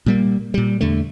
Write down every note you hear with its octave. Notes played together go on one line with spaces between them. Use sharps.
A#2 G3 A#3
A#2 G3
E2 D3 A3